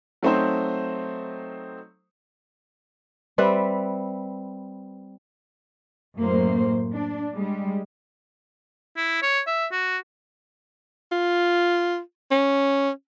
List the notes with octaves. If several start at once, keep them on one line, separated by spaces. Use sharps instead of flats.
F#3 A3 C4 D#4 C5
G3 C4 B4 E5
F#2 A2 A#3 C5
D4
G3 G#3
E4
C#5
E5
F#4
F4
C#4